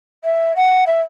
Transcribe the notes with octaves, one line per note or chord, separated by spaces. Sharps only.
E5
F#5
E5